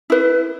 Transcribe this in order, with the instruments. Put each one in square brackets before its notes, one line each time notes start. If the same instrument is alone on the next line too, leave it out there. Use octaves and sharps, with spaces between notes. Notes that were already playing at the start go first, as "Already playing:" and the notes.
[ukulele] E4 B4